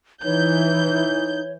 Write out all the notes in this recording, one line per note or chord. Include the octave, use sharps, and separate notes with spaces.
E3 D#4 C#5 G6